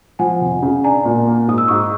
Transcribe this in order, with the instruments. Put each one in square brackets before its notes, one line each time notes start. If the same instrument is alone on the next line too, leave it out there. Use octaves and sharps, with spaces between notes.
[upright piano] F3 [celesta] F#5 G#5
[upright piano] F1
C#3
[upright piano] D4 [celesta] G#5 A#5
[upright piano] A#2
A#3
[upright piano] G#2 [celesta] D#6
[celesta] E6
[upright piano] G#2 [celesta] C#6 D#6